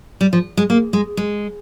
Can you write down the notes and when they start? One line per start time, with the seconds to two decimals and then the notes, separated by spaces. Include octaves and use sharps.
0.21 G3
0.33 F3
0.57 G#3
0.70 A#3
0.93 G#3
1.17 G#3